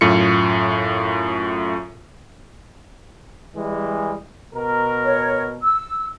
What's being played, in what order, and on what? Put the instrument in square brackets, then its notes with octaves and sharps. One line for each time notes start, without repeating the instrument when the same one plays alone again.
[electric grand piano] F#2 A2 F4 C#7
[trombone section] E3 G3 G#3
B2 A#4
[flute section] C#5
E6